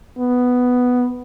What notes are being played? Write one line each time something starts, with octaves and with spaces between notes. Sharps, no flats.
B3